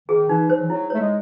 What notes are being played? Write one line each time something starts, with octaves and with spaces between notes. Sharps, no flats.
D#3 G#4
E3 D#4
F#3 C5
E3
F#3 E4
A3 C#5
G#3